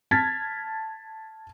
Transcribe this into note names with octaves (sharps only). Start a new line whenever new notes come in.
A5 F6 G#6 A6 B6